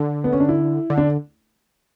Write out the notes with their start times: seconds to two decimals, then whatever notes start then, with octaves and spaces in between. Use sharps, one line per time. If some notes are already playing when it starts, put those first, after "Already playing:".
Already playing: D3 D4
0.24 B3
0.33 C#4
0.40 D4
0.49 E4
0.90 D3
0.98 D4